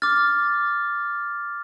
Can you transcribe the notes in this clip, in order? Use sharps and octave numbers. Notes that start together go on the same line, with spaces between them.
D6 F6 A6